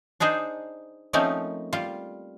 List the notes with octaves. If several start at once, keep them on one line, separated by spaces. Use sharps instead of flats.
D4 D#4 G#4 C5
F3 A3 A#3 C4 C#4 D#4
G3 F4